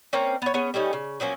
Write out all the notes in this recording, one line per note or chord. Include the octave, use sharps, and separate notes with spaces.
A#3 C4 C#4
B3 C#5
B3 C#4 G#4
G3 A3 C#4 D#4
C#3
F3 F#3 A#3 C#4